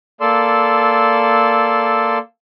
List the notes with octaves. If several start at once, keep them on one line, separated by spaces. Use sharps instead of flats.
A#3 A4 D5 C6 E6